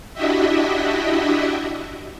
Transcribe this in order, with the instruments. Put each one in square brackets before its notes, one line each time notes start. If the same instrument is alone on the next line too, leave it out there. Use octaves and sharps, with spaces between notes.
[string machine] D4 E4 F#4 G4 D#5 E5